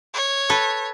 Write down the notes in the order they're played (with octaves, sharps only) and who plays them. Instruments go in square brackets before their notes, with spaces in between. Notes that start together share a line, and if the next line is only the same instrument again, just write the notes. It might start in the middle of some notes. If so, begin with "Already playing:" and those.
[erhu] C#5
[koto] A4 B4